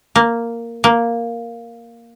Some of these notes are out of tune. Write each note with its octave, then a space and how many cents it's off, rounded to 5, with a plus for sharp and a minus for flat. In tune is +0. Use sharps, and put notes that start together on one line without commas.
A#3 -5
A#3 +0